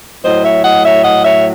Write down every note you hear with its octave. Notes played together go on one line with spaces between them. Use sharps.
A2 F#3 C5 D#5
C#5 E5
D#5 F#5
C#5 E5
D#5 F#5
C#5 E5